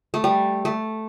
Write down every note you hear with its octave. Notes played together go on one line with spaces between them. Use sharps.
A3
G3
A3